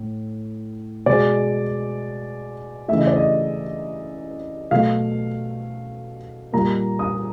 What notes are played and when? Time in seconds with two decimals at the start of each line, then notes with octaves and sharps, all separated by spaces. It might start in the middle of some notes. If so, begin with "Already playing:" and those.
Already playing: A2
1.06 B2 G#3 D5
2.88 C#3 E3 A3 E5
2.98 D#5
3.07 D5
3.16 D#5
4.71 B2 F#3 A3 F5
6.53 A#2 G3 A#3 A#5
6.99 D#6